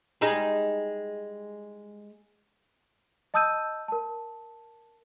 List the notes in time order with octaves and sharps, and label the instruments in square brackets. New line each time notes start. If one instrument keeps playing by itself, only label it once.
[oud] G3 G#3 D#4
[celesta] D#5 A5 D#6 E6 G6 D#7
A#4 A5